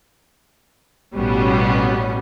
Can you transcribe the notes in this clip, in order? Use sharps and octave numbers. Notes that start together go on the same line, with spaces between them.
A1 B2 G3 B3 C#4